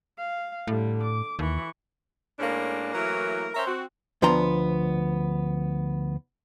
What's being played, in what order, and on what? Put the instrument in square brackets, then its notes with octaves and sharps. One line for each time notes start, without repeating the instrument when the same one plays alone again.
[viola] F5
[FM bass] A2 [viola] D3 G3
[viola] D6
[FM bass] D#2 [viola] E3 C#6
[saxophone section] A2 G#3 A#3 C#4 D4
E3 F#3 A3 A#3 E4 A#4
C#4 A#4 C5 C#5 E5
C4 F#4
[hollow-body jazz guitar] D2 F3 B3 D4 A#5 C6